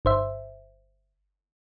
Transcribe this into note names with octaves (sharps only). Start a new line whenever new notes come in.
G1 C5 E5